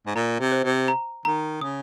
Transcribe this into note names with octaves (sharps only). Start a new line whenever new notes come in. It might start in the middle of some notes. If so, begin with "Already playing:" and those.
G#2
A#2 A#5
C3
C5
C3
A#5
D#3 A#5
C#3 D#6